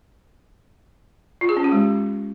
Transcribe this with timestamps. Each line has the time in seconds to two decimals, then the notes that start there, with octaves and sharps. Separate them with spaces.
1.41 F4
1.49 G#4
1.57 C#4
1.64 G4
1.72 G#3